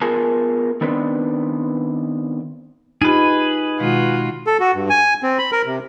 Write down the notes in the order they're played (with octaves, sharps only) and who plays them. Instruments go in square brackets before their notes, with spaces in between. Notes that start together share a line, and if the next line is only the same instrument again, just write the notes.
[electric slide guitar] B3 F4 G#4 A#4 G#5 A5
D#3 B3 C4 D4 B4
[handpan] D#4 [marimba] F4 G4 [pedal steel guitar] G#4 B4
[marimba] B2 D#3 G#3 [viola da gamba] F4 F#4
[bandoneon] A4
F#4
G2
G#5
C4
B5
A#4
C3